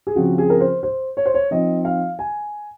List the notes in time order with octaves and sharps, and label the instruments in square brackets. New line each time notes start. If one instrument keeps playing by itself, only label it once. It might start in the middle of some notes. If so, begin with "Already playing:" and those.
[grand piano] G#4
C#3 F3 C4 F#4
G#4
A#4
C5
C5
C#5
C5
C#5
F3 C4 D#4 D#5
F5
G#5